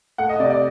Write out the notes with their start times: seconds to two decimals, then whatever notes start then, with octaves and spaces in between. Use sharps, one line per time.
0.18 A3 F#5
0.29 D#5
0.40 C3 D5
0.50 D5